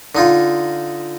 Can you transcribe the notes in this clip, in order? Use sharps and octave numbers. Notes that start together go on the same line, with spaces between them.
D3 D#4 F4